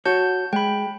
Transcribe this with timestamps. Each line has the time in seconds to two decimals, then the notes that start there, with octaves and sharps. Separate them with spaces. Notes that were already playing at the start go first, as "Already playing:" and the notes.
0.05 F#4 C#5 A5 G6
0.53 G#3 G5 B5